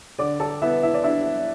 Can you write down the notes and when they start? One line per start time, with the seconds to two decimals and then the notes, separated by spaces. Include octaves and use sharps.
0.19 D3 D5 D6
0.40 A4 A5
0.62 B3 E4 E5
0.83 E4 E5
0.94 D5
1.04 D4 E4 E5